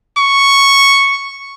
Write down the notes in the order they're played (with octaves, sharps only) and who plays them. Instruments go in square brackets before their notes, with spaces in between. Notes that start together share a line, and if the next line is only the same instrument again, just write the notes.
[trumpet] C#6